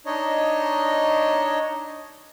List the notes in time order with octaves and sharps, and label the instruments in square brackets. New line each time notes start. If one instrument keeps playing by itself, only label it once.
[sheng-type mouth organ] D4 D#4 C#5 D#5